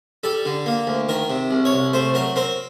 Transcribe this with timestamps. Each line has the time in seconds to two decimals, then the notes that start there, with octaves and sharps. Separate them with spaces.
0.23 G3 A4
0.46 D3
0.66 A#3
0.87 D2
1.09 D#3 A#4
1.30 C3
1.51 C2
1.65 C#5
1.72 C2
1.93 A3 C5
2.14 F#3 A#4
2.36 C4 A#4